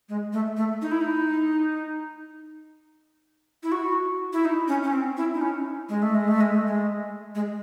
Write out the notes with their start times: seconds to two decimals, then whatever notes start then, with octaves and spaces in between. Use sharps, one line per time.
0.09 G#3
0.33 A3
0.57 A3
0.82 D#4
0.92 E4
1.01 D#4
3.63 E4
3.72 F#4
4.33 E4
4.45 D#4
4.68 C#4
4.83 C#4
4.93 C4
5.17 E4
5.34 D#4
5.41 C#4
5.89 G#3
6.02 A3
6.15 G#3
6.28 A3
6.41 G#3
6.54 A3
6.66 G#3
7.35 G#3